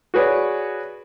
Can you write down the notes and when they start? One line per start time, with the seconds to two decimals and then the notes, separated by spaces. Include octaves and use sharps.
0.14 F#4 G#4 B4 C#5 D5